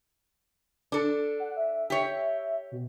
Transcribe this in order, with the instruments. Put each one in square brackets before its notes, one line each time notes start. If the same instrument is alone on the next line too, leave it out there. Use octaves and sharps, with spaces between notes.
[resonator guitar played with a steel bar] D4 A4
[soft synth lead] F#5
E5
[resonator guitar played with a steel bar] G4 C#5
[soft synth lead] B2